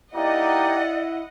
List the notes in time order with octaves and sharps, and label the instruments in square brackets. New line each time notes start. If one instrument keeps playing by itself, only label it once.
[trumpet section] A#3 D#4 G4 [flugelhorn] E4 [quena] D5 [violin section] D#5 F#5